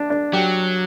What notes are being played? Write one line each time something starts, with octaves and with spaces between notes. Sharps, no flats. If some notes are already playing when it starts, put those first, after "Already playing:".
Already playing: D4
D4
F#3 G4